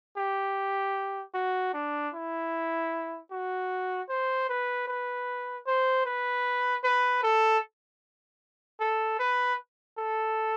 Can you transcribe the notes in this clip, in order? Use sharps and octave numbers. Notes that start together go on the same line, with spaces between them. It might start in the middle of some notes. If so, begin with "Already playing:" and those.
G4
F#4
D4
E4
F#4
C5
B4
B4
C5
B4
B4
A4
A4
B4
A4